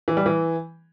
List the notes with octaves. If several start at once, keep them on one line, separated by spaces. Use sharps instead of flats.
E3
G3
E3